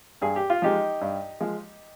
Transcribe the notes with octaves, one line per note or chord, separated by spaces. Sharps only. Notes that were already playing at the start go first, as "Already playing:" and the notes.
G2 G#4
G4
F4
F3 G#3 D#4 G4
G2
F3 G#3